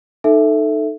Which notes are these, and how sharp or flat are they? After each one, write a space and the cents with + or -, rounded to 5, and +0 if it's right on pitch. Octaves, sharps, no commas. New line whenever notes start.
D#4 -20 A4 +0 E5 +0